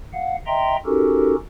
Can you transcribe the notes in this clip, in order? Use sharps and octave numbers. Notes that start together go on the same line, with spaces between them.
F5 F#5
D#5 E5 G5 A#5 C6
C#4 D#4 F#4 G4 A4 A#4